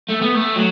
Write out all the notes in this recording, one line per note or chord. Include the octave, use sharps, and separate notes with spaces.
A3
B3
A3
F#3